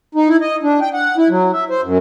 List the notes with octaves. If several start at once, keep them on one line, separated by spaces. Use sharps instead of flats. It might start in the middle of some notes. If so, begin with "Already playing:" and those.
D#4
E4
D#5
D4
G5
F#5
E4
F#3
E5
C5
F#2